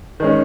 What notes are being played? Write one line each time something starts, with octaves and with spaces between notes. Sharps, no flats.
D#3 G#3 C#4